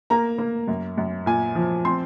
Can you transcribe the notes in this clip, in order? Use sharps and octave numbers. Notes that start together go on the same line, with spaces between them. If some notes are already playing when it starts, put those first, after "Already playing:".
A#3 A#5
A#3
F#2
F#2
A#2 G#5
F3
C4 C6